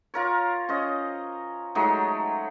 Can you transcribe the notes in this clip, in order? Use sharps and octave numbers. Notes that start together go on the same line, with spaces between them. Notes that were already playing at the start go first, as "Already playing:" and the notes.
F4 A#4 C#5
C#4 C5 D#5
F#3 G#3 A3 D#4